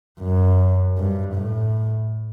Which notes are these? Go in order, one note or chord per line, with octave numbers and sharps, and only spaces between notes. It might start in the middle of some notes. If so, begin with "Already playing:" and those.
F#2
G2
A2